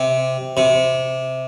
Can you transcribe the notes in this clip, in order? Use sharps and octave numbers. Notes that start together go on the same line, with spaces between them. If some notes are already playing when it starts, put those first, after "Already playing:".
Already playing: C3
C3